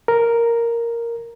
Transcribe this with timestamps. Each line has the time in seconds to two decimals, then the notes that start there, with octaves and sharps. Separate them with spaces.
0.08 A#4